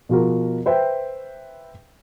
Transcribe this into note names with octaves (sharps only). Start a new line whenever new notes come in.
B2 F3 F4 F#4 G#4 A#4
B4 C5 E5 G5